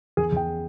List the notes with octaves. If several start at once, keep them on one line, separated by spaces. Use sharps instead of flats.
E2 G#4
E2 G5